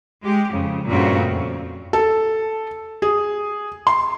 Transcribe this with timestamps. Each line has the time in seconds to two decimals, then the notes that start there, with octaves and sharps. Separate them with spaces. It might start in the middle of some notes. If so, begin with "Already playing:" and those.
0.23 G#3 G4
0.53 F2 C#3
0.87 G2 A#2 C#3 A3 C4 F#4
1.28 F2
1.93 A4
3.02 G#4
3.87 C6